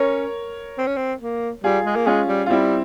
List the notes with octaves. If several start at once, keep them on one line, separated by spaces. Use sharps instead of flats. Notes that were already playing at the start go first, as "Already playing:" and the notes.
Already playing: C#4 A#4 C#5
C4
C#4
C4
A#3
G3 F4 G#4
G#3
A#3
G#3 C#4 F4
G3
F4
G3 C4 E4